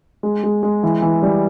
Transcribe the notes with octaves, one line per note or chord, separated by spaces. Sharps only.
G#3
G#3
G#3
E3
E3
G3